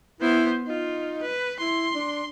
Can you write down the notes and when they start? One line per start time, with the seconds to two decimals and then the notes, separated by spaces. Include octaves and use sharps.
0.21 B3 E4 C5
0.66 D#4 F4
1.23 B4
1.60 E4 C6
1.95 D4